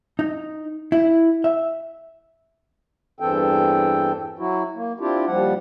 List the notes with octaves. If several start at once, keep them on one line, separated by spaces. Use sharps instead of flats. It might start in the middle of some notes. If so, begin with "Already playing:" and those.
D#4
E4
E5
E2 G2 E3 C4 A4 G5
F#3 E4 F#4
A#3
C4 D4 E4 F4 G4
D#2 F3 G3 F#5